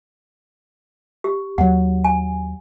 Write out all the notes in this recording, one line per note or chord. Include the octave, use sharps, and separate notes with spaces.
G4
D#2 F#3 F#5
G#5